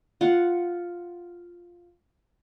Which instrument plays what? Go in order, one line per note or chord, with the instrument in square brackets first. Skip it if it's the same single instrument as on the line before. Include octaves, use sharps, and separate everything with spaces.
[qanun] F4 F#5